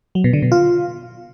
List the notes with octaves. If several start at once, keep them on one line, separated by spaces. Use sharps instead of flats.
F#3
B2
D3
B2
F4